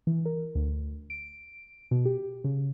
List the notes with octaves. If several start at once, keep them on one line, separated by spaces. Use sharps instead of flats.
E3
A#4
D2
D7
B2
G4
C#3